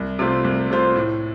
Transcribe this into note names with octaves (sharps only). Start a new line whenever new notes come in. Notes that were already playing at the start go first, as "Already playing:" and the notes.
Already playing: C2
C3 A3 F4 C5
C2
C3 A3 F4 C5
A2